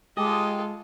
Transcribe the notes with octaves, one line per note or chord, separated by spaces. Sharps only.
G#3 F4 G4 A4 D#5